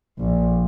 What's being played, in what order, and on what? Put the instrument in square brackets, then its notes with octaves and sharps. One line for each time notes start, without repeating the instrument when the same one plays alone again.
[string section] A#1